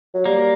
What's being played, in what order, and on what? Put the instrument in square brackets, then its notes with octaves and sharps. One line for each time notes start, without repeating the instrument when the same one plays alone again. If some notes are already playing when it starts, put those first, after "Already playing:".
[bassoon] F#3
[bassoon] G3 [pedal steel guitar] A#3